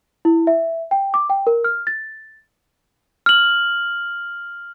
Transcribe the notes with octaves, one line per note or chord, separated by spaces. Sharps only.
E4
E5
G5
D6
G5
A#4
F6
A6
F6 F#7